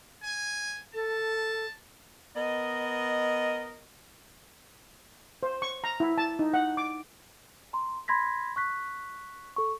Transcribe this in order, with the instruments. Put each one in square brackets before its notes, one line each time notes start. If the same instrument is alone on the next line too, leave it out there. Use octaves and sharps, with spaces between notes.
[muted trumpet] G#5
[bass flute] A4 [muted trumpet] A5
[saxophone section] B3 A#4 D#5
[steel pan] C5
C#6
A#5
E4
A5
D#4
F#5
D6
[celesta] A#5 C6
B5 C6 G#6 A#6 B6
C#6 F#6 B6
A4 C#6